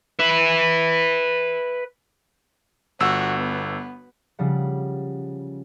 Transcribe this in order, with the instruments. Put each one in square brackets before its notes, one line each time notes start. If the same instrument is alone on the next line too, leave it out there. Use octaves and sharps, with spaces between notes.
[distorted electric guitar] B4 E5
[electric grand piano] G1 E6 [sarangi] F#4
[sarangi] B3
[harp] C#3 F3 G3 F#5